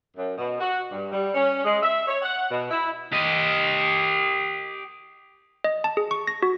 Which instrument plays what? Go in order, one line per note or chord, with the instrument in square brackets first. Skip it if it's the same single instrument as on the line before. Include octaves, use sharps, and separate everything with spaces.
[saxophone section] F#2
B2
F#4
G2
G3
C#4
G#3
E5
C#5
F#5
B2
E4
[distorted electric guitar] G4 D#5
[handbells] D#5
A5
G#4
C#6
A#6
F#4